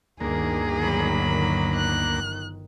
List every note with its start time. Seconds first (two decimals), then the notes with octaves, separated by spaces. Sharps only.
0.20 G1 D2 D#3 A#3 G#4
0.78 F#3 B5
1.75 F#6